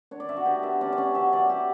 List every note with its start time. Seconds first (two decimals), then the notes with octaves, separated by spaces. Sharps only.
0.11 D4 C#5
0.20 D5
0.29 D4 E5
0.37 F#4
0.45 B3 G4
0.63 B3 E5
0.81 C#4 D5
0.93 D5
0.98 C#4
1.15 F#3 E5
1.33 F#3 D5
1.49 G4